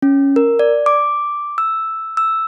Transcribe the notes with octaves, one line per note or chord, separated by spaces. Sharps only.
C#4
A#4
D5
D6
E6
E6